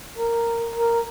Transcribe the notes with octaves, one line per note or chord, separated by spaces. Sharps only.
A#4
A#4